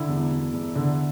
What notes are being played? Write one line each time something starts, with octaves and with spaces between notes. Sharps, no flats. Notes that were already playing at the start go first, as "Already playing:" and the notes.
Already playing: D3 E4
E1
E1
E1
D3